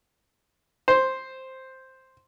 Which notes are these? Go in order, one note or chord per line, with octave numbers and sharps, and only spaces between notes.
C5